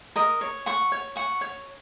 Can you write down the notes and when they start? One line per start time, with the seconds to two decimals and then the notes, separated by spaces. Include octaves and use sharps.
0.16 A#4 D#5
0.41 C#5
0.66 F#5 C#6
0.92 C#5
1.16 F#5 C#6
1.41 C#5